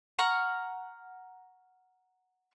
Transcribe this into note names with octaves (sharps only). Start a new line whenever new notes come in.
F#5 A#5 C#6 F6